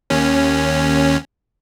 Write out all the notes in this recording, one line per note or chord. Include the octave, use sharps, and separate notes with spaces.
D#2 C#4